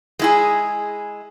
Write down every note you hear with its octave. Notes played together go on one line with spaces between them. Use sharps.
G#3 E4 G#4